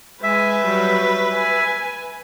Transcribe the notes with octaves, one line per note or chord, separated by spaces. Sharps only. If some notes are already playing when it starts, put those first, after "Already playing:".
G#3 B4 E5 G#5
F#3 G3
G#5